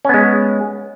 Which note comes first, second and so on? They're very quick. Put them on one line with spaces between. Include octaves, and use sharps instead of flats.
C#4 B3 G#3